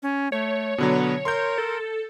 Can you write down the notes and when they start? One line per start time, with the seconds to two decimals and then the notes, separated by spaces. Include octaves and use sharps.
0.03 C#4
0.32 A3 C#5
0.78 B2 D3 F#3 B3
1.25 A#4 C6 G6
1.58 A4